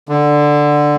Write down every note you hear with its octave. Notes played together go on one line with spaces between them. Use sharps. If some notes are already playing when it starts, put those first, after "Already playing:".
D3